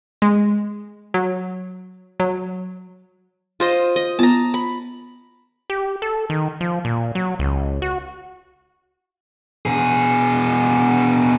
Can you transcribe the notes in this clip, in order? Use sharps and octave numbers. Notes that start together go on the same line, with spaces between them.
G#3
F#3
F#3
F4 C5 D#5
D#5
B3 F4 A5 A#5
B5
G4
A4
D#3
F3
A#2
F#3
C#2
F#4
B2 G#4